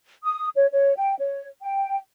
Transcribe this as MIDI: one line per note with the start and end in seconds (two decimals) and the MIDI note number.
0.24 0.48 87
0.56 0.67 73
0.72 0.93 73
0.96 1.14 79
1.18 1.47 73
1.61 1.98 79